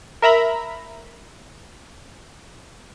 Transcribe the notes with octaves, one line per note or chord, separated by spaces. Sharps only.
A#4 E5 A#5 B5